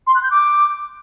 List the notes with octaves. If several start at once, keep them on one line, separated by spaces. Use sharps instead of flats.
C6
F#6
G6
D6